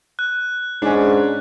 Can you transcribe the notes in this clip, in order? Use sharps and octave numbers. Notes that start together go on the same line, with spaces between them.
F#6
G#2 C#4 D4